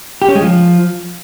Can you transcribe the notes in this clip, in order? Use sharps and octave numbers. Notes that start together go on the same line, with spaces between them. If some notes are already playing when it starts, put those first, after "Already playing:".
G4
C#4
G#3
F3